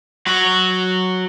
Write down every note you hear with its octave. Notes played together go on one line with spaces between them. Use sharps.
F#3 F#4